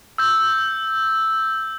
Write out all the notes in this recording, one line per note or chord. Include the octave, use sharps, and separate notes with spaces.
E6 G6